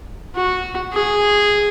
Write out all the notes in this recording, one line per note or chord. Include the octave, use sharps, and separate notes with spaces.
F#4
G#4